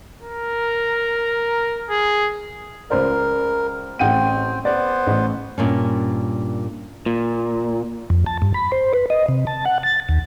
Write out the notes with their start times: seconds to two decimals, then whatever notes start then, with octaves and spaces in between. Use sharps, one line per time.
0.23 A#4
1.90 G#4
2.90 C#2 A#4 C5 D5
3.99 A1 C4 F#5 G5 D#7
4.65 B3 B4 C5 D5
5.07 A1
5.58 G2 A#2 C#4
7.06 A#2
8.10 F2
8.26 A5
8.42 G2
8.54 B5
8.72 C5
8.93 B4
9.10 D#5
9.28 C3
9.47 A5
9.66 F#5
9.83 A6
10.09 D#2